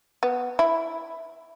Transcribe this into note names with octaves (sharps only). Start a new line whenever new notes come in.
B3
E4